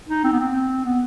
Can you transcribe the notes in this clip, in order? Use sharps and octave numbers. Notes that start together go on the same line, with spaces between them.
D#4
C4
B3
C4
B3